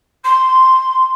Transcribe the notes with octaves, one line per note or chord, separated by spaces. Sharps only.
C6